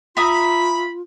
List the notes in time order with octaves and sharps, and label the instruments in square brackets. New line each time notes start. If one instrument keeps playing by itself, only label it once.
[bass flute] F4 [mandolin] E5 A#5 D#6 [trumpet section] B5